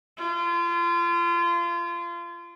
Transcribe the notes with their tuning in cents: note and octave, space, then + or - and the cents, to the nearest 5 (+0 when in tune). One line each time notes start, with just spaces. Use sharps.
F4 -30